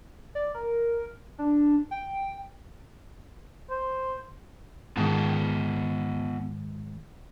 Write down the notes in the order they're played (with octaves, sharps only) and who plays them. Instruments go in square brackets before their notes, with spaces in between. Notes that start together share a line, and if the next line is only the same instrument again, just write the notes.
[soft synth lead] D5
A#4
D4
G5
[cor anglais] C5
[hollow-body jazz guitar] G#2 D#3 [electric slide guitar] B3 F4 A5